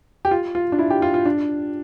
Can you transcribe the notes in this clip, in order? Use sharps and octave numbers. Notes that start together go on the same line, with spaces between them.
G4
F4
F4
D4
E4
G4
F4
F4
D4